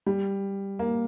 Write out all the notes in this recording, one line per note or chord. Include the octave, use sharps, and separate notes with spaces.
G3
A#3